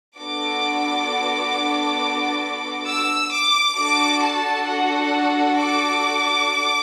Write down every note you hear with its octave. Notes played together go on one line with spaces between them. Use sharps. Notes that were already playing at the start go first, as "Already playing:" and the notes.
B3 D4 F#4 A4 D6
E6
D6
D4 F#4 A4 D6
A5
F#5
D6